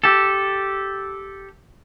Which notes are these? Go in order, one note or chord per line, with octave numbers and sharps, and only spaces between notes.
G4 A4